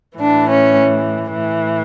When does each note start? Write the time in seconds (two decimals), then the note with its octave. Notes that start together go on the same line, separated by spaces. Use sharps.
0.18 A2 E3 D4
0.46 C#4
1.33 A2 E3